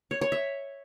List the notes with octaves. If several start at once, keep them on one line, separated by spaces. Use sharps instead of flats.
C#5
C#5
E5